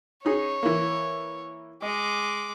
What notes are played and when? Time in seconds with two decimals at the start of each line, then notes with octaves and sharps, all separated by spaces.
0.25 C#4 D#4 G#4 C#5
0.63 E3 A#3
1.82 G#3 D#5 D6